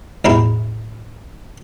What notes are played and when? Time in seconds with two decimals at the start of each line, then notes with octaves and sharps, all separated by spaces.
0.25 A1 E2 B2 D#4 E4